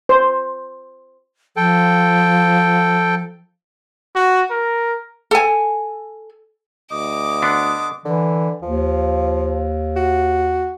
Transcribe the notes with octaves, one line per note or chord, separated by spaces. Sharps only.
C5
F3 A4 G5
F#4
A#4
A4 G#5
D2 D#5 D6
D3 B3 D4
D3 E3
D#2 F3
F#4